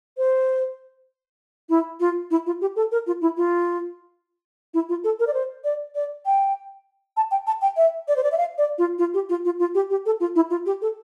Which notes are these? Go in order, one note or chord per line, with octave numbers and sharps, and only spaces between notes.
C5
E4
F4
E4
F4
G4
A4
A#4
F4
E4
F4
E4
F4
A4
A#4
D5
C5
D5
D5
G5
A5
G5
A5
G5
E5
D5
C5
D5
E5
F5
D5
F4
F4
G4
F4
F4
F4
G4
G4
A4
F4
E4
F4
G4
A4